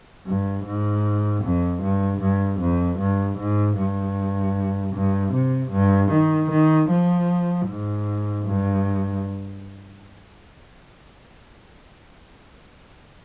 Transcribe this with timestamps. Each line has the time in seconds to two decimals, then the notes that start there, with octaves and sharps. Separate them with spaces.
0.26 G2
0.65 G#2
1.43 F2
1.82 G2
2.21 G2
2.60 F2
2.99 G2
3.38 G#2
3.78 G2
4.95 G2
5.33 C3
5.72 G2
6.11 D#3
6.51 D#3
6.90 F3
7.67 G#2
8.46 G2